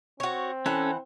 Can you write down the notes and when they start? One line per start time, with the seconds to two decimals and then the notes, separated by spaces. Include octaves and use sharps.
0.20 C4 F#4 C#5
0.66 E3 C#4 A4 F#5